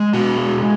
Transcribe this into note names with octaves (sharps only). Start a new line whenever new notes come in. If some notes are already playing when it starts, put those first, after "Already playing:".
Already playing: G#3
B2 F#4
G#3